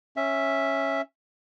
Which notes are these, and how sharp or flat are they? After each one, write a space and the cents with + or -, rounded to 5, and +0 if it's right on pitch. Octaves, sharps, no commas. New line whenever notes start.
C#4 -10 E5 +0